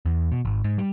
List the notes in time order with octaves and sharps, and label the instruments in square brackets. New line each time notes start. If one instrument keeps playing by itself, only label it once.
[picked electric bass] E2
B2
G#1
G#2
G3